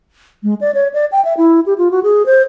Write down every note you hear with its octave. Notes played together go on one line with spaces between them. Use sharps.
G#3
D5
C#5
D5
G5
E5
E4
G4
F4
F#4
G#4
C5